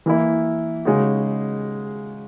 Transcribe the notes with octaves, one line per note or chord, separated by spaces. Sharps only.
E3 A#3 E4
C#3 G#3 D#4 F#4